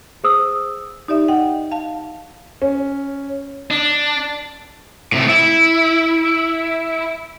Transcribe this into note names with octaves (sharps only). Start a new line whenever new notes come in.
G#4 C5 D#6 E6
D#4 G4 D5 E5
D#5 F#5 G5
F5 A5
C#4
D4
A2 C3 A3
E4